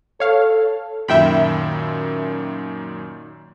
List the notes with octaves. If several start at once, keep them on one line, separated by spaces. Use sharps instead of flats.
A4 C#5 F5
F#2 A#2 D#3 E5 G5 B5